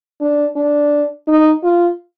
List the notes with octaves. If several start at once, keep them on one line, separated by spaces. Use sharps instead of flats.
D4
D4
D#4
F4